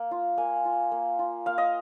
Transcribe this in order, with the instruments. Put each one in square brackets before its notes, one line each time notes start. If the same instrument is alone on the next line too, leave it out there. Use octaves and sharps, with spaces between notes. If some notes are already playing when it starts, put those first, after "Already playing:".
Already playing: [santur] A#3
F4
A#3 G#5
F4
A#3
F4
A#3 F5
D#5